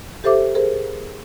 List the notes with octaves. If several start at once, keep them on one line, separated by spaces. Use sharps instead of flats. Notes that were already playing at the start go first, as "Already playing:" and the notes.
G4 A4 C5 E5 D6
G#4 A#4 C5